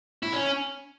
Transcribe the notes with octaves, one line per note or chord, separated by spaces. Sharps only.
E4
C#4